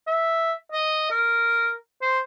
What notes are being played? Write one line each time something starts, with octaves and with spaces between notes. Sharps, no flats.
E5
D#5
A#4
C5